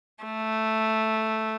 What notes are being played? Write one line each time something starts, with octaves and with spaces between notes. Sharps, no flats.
A3